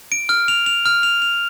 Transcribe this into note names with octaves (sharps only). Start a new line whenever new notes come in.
D7
F6
F7
F7
F6
F7
F7